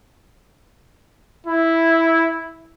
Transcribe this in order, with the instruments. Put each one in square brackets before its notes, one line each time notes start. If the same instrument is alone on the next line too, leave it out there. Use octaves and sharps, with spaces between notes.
[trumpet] E4